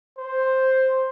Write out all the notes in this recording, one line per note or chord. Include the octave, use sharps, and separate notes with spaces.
C5